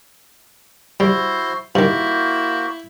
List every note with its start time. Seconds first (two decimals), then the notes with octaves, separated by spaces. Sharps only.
1.00 G3 E4 F#4 C5
1.75 G2 D#3 A#3 E4 F#4 C5